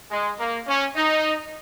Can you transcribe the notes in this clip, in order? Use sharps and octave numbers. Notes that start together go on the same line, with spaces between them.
G#3
A#3
C#4
D#4